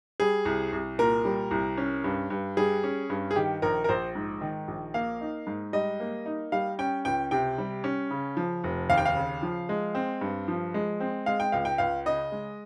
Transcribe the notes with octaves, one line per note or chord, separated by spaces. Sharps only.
G3 G#4
C2
C2
A#2 A#4
G3
C2
C#4
G2
G2
G3 G#4
C#4
G2
G#4
D#3 G4
A#1 A#4
A#4
A#1 C5
G#2
D#3
A#1
A#3 F5
D#4
G#2
G3 D#5
A#3
D#4
G3 F5
C#4 G5
C#2 G5
C3 G5
G3
C#4
C#3
F3
F1
D#2 F5
G5
F5
C#3
F3
G#3
C4
G2
F3
G#3
C4
G#3 F5
G5
C#2 F5
G5
C#2 F5
C#3 D#5
G#3